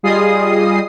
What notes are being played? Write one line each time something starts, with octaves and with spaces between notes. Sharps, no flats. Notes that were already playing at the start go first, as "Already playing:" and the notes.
G3 F4 G#4 D#5 D#6 C7